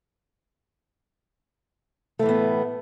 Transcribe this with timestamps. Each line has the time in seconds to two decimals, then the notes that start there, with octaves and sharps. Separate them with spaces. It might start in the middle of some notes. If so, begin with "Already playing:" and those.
2.19 A3
2.23 E3
2.26 A2
2.29 B3